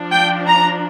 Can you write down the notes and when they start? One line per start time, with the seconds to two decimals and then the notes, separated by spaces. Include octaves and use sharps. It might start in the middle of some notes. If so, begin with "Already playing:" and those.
Already playing: F3 D4
0.11 G5
0.47 A#5